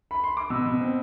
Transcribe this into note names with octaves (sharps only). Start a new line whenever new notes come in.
B5
C6
D6
B2 E6
B2
C4